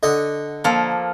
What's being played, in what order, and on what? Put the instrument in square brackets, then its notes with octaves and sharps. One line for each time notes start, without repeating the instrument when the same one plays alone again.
[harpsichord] D3 D#5 F#5
[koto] F3 A4 [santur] A#3